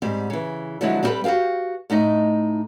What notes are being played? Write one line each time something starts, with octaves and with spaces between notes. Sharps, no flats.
G#2 G3 C4
C#3 E3
D3 F3 F#3 G#3 C4 E4
G3 C4 D#4 G4 A4 B4
F#4 G4 A4 F5 G5
A2 A3 D#4 D#5